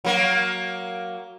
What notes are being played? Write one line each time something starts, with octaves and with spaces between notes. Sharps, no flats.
F#3 A#3